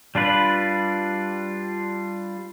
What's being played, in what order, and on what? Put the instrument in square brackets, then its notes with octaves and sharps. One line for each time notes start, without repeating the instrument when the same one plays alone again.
[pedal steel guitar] G3 D4 F4 B4